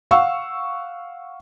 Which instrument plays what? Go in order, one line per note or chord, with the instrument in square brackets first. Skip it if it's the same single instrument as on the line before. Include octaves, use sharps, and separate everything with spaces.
[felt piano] F5 F#5 C#6 E6